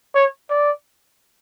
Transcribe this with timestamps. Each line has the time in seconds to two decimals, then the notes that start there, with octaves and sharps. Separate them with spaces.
0.15 C#5
0.50 D5